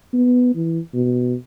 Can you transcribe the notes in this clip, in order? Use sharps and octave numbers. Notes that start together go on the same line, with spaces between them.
B3
E3
B2